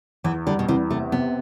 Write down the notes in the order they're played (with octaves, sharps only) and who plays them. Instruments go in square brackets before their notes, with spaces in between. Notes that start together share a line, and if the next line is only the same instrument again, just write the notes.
[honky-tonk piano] E2 [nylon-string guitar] E3
[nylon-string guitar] D3 [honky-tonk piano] G3
[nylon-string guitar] B2
[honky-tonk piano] E2 [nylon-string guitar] C3
[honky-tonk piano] C3 [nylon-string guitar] A3
[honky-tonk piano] C3 [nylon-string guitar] B3